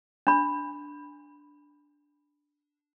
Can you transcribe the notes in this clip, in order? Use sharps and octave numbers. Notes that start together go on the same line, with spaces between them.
D4 B5